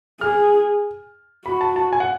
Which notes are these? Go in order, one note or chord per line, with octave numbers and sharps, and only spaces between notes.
G#4 F6
F#4 B5
A5
A5
G#5
F#5